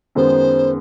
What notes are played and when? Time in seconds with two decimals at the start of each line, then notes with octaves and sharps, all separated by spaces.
0.15 F#2 D#3 G#3 B3 C5